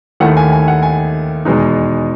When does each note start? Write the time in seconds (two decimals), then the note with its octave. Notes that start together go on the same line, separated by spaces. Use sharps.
0.20 D#2 D#3 A3 E4 F#5
0.37 G#5
0.52 G#5
0.68 F#5
0.83 G#5
1.45 E2 B2 G#3 D#4